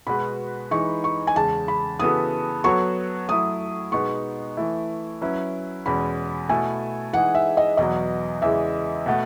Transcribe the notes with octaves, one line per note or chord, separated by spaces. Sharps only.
B2 G#3 B3 F#4 B4 B5
E3 G#3 D#4 C#6
C#6
G#5
E2 C#3 G#3 A5
B5
C#3 E3 B3 F#4 A4 D#6
F#3 B3 F#4 A4 C#5 C#6
F#3 A3 E4 D#6
B2 G#3 B3 D#4 C#6
E3 A3 E4
F#3 C#4 E4 B4
E2 B2 G#3 C#4 B5
B2 A3 E4 A4 G#5
E3 G#3 D#4 G#4 F#5
E5
D#5
E2 B2 F#3 B3 D#5
E2 C#3 E3 G#3 E5
B2 A3 F#5